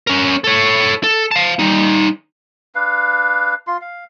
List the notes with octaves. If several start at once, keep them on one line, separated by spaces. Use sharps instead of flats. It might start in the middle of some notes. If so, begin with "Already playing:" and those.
C#4 A#4
A4 C#5
A4
F5 A5
G3 D#4
D4 B4 F5
F4 C6
F5